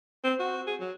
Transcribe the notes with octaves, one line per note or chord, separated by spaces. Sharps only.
C4
F#4
G#4
F#3